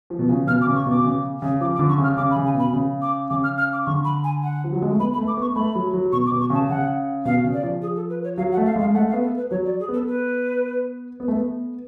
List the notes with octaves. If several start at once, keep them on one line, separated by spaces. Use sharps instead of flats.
F3
B2
C#3
B2 F6
D6
C#3
C#6
B2 D6
C#3
C#3
F3 D6
D6
D3
C#6
C#3
F6
C#3 D6
B5
C#3
G#5
B2 B5
C#3
D6
C#3 D6
F6
F6
D6
D3 C#6
B5
G#5
F#5
F3
F#3
G#3
A3
B3 B5
B5
A3
D6
B3 C#6
A3 B5
F#3
F#3
B2 C#6
D6
B2
C#6
C#3 A5
C#3 F#5
B2 F5
C#3
D5
F3
G#4
A4
B4
C#5
F#3 F5
F#5
A3
F5
G#3 F5
A3 F#5
F5
B3
A4
B4
F#3 C#5
D5
G#4
B3
A4
B4
B3
A3
B3